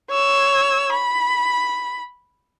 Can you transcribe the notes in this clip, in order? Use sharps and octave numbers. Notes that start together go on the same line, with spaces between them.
C#5 E6
B5